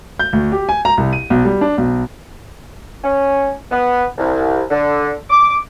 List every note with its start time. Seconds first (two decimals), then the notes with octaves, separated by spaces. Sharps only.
0.19 G6
0.33 D2
0.52 G4
0.69 G#5
0.85 A#5
0.98 C2
1.13 D#7
1.30 B1
1.45 G3
1.61 D4
1.78 B1
3.04 C#4
3.71 B3
4.18 C2
4.70 D3
5.30 D6